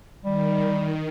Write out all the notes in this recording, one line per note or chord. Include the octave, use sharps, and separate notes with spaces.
D#3 G3